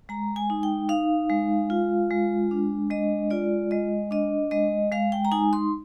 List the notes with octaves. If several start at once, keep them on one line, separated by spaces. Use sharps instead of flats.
G#3 A#5
G#5
D#4
G5
D#4 F5
G#3
F4
G#3
D4
G#3 D#5
F4 D5
G#3 D#5
D4 D#5
G#3 D#5
G#3 F5
G5
A#5
D#4 G#5
C6